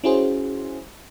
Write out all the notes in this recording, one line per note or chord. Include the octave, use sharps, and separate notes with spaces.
C#4 E4 F#4 G#4 C5